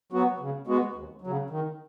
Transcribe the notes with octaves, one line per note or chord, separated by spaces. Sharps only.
F#3 B3 F#4
C#3
G#3 B3 F#4
D#2
F#3
C#3
D#3